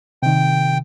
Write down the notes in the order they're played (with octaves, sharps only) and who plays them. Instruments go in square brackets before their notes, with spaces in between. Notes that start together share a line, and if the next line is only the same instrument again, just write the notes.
[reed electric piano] C3 D#3 [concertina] G5